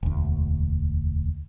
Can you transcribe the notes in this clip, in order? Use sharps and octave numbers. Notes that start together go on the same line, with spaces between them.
E1 D2